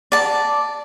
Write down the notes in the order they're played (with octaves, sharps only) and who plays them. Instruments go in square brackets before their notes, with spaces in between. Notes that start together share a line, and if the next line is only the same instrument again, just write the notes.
[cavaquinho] D5 A5